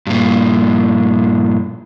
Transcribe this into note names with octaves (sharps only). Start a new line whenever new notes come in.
G2 A#2